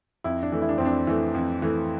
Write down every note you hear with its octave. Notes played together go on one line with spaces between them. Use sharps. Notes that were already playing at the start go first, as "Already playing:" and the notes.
F2 E4
D4
E3 A3
E4
D4
F2 C4
D4
E3 A3
F2
E3 A3